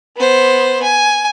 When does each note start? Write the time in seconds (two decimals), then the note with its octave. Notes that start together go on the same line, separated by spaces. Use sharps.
0.17 B3 C5
0.83 G#5